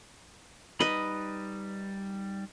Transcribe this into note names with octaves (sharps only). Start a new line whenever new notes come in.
G3 D#4 B4 D#5 B5